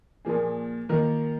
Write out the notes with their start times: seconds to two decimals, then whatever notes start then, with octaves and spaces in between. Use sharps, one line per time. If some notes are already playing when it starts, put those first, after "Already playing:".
0.25 A#2 F3 A#3 G#4
0.89 D#3 A#3 F4 A#4